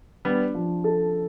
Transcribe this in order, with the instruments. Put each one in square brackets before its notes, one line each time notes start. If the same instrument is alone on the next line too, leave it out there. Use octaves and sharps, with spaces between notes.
[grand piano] G3 B3 [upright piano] D4
[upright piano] F3
A4